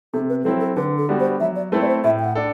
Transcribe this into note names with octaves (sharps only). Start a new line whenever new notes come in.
C3 A4
B4
F#3 C4 E4 A4
A4
D3 B4
A4
G3 B3 D4 F#4
C5
F#3 E5
D5
A3 C4 E4 A4 B4
D5
C5
A2 E5
G5
F#5
D4 A4